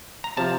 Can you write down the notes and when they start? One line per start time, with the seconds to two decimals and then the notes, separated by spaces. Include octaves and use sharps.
0.24 A#5
0.37 C3 F3 A5